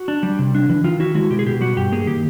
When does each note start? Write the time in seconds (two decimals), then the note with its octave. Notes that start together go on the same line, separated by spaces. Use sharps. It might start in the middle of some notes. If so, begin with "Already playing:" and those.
Already playing: F#4
0.08 D4
0.23 G3
0.39 C3
0.55 D4
0.69 E3
0.84 D#3 F4
1.00 E4 F#4
1.15 G#3 F#4
1.30 B2 G4
1.39 G#4
1.46 B2 G4
1.61 G3 F#4
1.77 G2 G4
1.92 A#3 G#4
2.07 D#3 G4